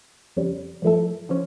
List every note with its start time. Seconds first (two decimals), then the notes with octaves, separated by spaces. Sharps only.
0.36 F2 C#3 G3
0.82 G2 F3 A3 E4 A4
1.29 D3 F3 C#4